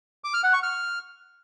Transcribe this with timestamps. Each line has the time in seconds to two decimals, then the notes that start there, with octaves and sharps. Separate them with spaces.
0.24 D6
0.34 F6
0.44 F#5
0.53 C#6
0.63 F6